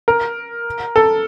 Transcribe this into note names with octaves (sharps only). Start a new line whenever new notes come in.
A#4
A4